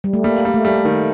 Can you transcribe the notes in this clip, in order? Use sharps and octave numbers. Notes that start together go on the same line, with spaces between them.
G3
A3
G3 A#3
G3
A3
G3
D#3